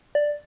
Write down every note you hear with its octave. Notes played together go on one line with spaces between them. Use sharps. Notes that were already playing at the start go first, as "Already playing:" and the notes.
D5